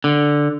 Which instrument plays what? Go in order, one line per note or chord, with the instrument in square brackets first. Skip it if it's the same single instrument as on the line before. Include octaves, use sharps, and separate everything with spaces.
[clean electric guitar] D3